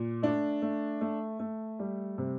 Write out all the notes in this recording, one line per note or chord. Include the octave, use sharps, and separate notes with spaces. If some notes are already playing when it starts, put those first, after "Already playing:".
Already playing: A#2
A3 D4
A3
A3
A3
G3
C3